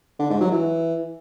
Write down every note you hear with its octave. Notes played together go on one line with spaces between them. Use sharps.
D3
G#2
F#3
E3